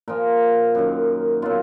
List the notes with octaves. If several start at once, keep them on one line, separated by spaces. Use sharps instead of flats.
A#2 F3 A#4
F#2 D#3 F#3
B2 F#3 F4